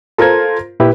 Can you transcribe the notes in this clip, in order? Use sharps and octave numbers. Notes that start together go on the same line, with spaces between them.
F4 A4 A#4 C5 G#6
A#2 E4 G4 B4